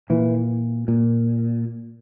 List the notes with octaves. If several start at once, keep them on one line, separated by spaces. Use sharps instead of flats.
A#2 E3
A#2